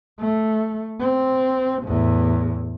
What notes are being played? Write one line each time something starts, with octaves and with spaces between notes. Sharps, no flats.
A3
C4
E2 A2